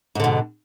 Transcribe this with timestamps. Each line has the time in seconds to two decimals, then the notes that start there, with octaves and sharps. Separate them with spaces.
0.15 G#2
0.20 D3
0.24 B2